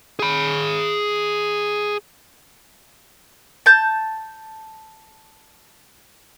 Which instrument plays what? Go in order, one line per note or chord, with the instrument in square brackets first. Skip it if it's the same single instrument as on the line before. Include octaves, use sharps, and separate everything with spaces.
[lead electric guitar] G#4 B5
[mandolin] A5 G6